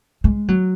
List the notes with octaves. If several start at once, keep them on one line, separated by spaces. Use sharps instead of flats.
G#3
F#3